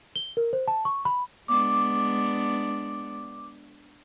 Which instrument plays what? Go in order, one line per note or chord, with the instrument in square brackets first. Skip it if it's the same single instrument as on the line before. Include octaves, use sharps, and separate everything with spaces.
[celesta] G7
A#4
C5
A5
C#6
B5
[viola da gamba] G#3 B3 D4 [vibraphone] D6